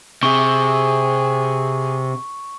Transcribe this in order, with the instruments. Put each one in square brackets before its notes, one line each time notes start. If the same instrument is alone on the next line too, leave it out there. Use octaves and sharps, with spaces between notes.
[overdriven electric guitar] C3 [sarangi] G#4 [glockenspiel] C#6